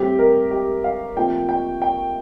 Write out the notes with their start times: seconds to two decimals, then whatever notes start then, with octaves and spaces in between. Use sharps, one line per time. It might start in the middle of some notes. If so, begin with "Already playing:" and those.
Already playing: A2 G3 C4 G4
0.19 A#4
0.51 G4
0.84 F5
1.16 A#2 F3 A3 C4 G5
1.49 G5
1.82 G5